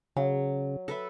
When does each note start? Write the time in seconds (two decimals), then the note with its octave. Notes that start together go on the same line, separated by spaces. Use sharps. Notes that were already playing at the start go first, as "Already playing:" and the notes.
0.16 C#3 F#3
0.88 A4 B4 E5